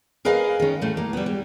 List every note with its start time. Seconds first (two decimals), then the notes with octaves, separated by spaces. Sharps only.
0.25 G#4 A#4 B4 D#5 F5 G#5
0.60 D#3 C#4
0.81 A2 A3
0.97 A#3
1.13 G3 B3
1.26 G3